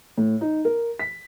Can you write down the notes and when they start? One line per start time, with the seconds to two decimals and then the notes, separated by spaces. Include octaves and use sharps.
0.17 A2
0.41 D#4
0.65 A#4
0.99 B6